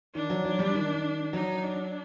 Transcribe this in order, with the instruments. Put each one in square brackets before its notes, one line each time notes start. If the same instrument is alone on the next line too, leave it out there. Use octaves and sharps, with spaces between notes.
[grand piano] D#3 [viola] D4
[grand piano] F#3
F#3
G3
D#3
[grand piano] F#3 [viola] D#4
[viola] D4